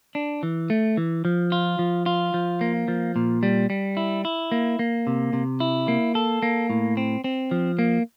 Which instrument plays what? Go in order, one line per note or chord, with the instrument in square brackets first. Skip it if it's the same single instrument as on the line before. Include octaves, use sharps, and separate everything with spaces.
[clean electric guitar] D4
E3
A3
E3
F3
F4
F3
F4
F3
A#3
F3
A#2
G3
G3
E4
E4
A#3
A#3
C3
C3
E4
A#3
A4
A#3
A2
C4
C4
F3
A#3